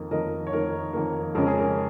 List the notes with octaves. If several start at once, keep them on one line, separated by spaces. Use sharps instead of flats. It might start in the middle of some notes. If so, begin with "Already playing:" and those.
Already playing: F2 D#3 A#3
F2 D#3 A#3 A#4 D#5
C#5
F2 D#3 A#3 A#4
F2 D#3 A#3
F2 C#3 G#3 C#4 A#4
G#4
A#4